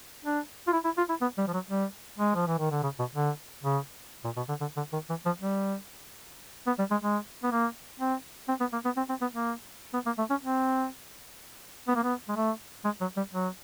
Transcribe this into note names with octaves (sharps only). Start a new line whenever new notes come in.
D4
F4
E4
E4
F4
E4
B3
G3
F3
F#3
G3
G#3
F3
E3
D#3
D3
C#3
B2
D3
C#3
A#2
B2
D3
D3
D3
D#3
E3
F3
G3
B3
G3
G#3
G#3
B3
A#3
C4
C4
B3
A#3
B3
C4
C4
B3
A#3
B3
A#3
A3
C#4
C4
B3
A#3
B3
G#3
A3
G#3
F#3
G3
F#3